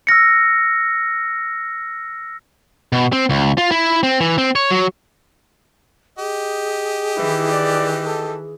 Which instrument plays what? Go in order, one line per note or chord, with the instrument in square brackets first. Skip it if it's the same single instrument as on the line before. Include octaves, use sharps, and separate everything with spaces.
[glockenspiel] E6 F6 A#6 C#7
[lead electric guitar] B2
C4
C#2
F4
E4
C4
E3
C4
C#5
F#3
[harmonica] G4 D#5 [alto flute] G#4
[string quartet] D#3 E3 [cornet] E4
[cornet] D5
A4